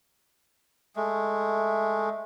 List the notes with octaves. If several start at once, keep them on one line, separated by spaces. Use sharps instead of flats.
G#3 A3